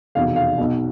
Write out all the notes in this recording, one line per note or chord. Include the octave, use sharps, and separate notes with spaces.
F1 E2 B2 F5
F5
B1 B2